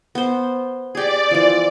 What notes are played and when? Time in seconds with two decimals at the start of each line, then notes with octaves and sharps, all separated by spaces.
0.15 B3 C5
0.95 G4 G#4 D5
1.31 E3 F3